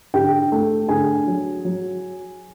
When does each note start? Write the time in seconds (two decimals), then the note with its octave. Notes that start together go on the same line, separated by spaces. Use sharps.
0.14 D3 G4 G5
0.52 A3
0.89 D3 G#4 G#5
1.27 F#3
1.65 F#3